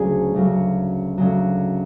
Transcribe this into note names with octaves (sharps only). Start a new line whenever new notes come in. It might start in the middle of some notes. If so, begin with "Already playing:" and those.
Already playing: D2 C#3 F#3 G#4
D2 C#3 F#3
D2 C#3 F#3